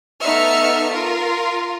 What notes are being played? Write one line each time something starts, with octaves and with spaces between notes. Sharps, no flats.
A3 B3 D#4 E5 F6 C#7
F4 A#4